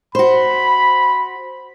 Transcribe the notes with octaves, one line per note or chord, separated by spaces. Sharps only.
F#4 C5 B5